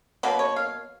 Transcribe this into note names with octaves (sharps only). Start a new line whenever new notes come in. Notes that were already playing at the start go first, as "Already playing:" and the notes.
B2 F#3 A#3 B4
C#5
F5